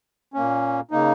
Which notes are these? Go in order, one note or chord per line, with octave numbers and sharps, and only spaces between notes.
A#2 A#3 C#4
C#3 A#3 D#4